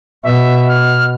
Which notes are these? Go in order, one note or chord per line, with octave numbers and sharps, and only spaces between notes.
B2 E5
F6